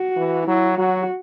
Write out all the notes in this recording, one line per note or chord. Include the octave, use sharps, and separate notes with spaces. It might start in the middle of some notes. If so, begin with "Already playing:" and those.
Already playing: F#4
E3
F#3 E4
F#3 F#4